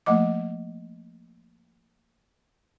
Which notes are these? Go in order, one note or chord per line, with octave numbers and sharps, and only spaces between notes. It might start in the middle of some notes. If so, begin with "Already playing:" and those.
F3 A3 A#3 D#5 D6